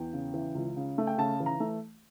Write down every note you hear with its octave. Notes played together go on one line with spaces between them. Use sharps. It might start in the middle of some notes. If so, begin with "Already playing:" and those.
Already playing: E2 G5
C#3
E3
C#2
C#3
A3
G5
C#3 A5
E3
A#5
A3